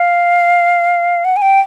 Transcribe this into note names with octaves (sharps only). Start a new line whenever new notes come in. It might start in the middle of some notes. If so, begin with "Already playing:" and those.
Already playing: F5
F#5
G#5
G5